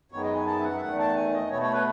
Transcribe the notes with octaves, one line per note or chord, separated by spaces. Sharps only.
F#2 D#3 G#3 B3 C#5
D#5
G#5
A5
E5
F#5
E5
E2 D#3 A3 F#5
A5
G#5
D#5
B2 A3 C#5
C#5
B4